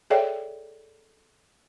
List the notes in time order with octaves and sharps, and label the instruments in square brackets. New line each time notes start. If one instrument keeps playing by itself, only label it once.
[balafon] G#4 A4 C#5 D5 E5 G5